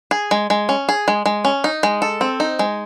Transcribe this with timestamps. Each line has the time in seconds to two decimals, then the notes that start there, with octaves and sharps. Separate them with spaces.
0.11 G#4
0.31 G#3
0.50 G#3
0.69 C#4
0.89 G#4
1.08 G#3
1.26 G#3
1.45 C#4
1.64 D#4
1.83 G#3
2.02 A4
2.21 C4
2.40 D#4
2.59 G#3